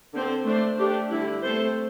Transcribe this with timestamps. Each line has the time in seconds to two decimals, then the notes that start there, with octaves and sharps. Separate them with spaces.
0.13 D3 C4 A4 C5
0.45 A3 D4 C5
0.78 A3 D4 G4
1.10 D3 G3 E4
1.43 A3 C4 A4 C5